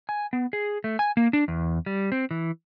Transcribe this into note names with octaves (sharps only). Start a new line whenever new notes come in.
G#5
B3
G#4
A3
G#5
A#3
D4
E2
G3
C4
E3